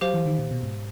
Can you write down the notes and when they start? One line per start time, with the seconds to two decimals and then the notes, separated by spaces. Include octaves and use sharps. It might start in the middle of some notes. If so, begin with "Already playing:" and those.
0.01 F#3 G4 C5 F5
0.14 E3
0.26 D#3
0.39 A#2
0.51 B2
0.63 G#2